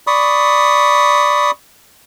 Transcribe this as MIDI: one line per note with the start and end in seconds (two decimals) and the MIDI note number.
0.07 1.51 74
0.07 1.51 83
0.07 1.51 85
0.07 1.51 87